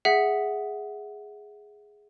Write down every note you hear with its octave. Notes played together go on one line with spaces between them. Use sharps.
G#4 E5 F#5 B6